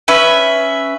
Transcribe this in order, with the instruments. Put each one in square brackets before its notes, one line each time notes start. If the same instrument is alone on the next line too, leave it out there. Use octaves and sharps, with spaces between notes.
[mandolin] C#4 B4 E5